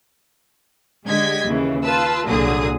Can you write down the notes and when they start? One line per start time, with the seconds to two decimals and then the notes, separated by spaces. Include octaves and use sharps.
1.06 D3 G#3 G4 D#5 G#6 B6
1.45 D#2 C#3 E3
1.84 F4 B4 A5 E6
2.26 C2 A#2 D3 F#3 G#4 D#6